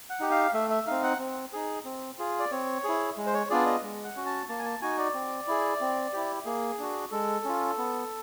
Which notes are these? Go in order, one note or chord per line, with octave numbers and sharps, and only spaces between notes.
F#5
D#4 G4
F5
A3 E5
E5
C4 D#4 F5
F#5
C4
D#4 G#4
C4
F4 G#4
D5
C4 C#5
E4 G#4
G#3
C5
C#5
B3 D4 F4 G#4 D5
D#5
G#3
F#5
C#4 F#4
A5
A#3 A5
G#5
A5
D#4 F#4 G#5
D5
C4
E4 G#4
C4
E4 G4
A#3 G#4
D4 F#4
G#3 A4
C#4 F4
B3